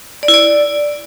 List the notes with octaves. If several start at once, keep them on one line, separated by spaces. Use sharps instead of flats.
D5
E4
D5